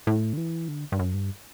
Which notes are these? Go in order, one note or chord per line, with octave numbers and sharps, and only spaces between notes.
A2
D3
E3
D3
G2
F#2
G2